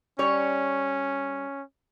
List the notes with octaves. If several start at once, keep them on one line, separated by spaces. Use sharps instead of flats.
G3 C#4 C#5